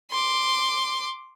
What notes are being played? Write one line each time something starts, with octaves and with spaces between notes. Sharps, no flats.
C6 D6